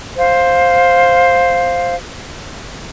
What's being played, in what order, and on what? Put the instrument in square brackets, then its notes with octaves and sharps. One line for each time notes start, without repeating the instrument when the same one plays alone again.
[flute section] C5 F5